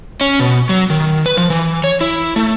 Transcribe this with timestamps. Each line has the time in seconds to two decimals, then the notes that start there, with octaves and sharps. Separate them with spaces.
0.21 C#4
0.40 B2
0.69 F#3
0.90 D#3
1.26 B4
1.37 F3
1.50 E3
1.84 C#5
2.01 E4
2.36 A3